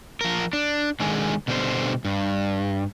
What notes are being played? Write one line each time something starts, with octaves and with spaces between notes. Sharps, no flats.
F3 A#4
D4
D3 D#3 G#3 G#4
B2 D3 G3 A4 C5
G2